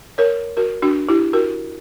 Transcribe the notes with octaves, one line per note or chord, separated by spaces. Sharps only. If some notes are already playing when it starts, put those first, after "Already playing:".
A#4 C#5
F#4 A#4
D4 F#4
E4 G4
F#4 A#4